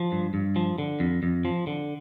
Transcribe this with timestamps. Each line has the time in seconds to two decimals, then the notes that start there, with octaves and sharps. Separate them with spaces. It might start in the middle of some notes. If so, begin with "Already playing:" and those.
Already playing: F3
0.12 G2
0.34 G2
0.56 F3
0.78 D3
1.00 F2
1.23 F2
1.45 F3
1.67 D3